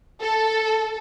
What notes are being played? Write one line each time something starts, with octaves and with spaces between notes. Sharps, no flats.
A4